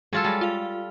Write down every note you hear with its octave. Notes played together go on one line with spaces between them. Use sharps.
F#3 G#3 F4 A4 G#6 A6
G3 G#3 A5
F4 F5